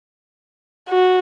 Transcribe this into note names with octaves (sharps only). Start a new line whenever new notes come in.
F#4